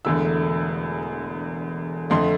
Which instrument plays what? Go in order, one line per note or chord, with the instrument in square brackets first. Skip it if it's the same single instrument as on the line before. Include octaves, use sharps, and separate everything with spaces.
[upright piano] E1 E2 D3 A3 E6
F2 D3 A3 C6